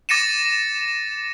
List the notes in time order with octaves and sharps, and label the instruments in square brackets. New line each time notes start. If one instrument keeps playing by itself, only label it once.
[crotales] D6 A6 A#6 C#7 D#7 E7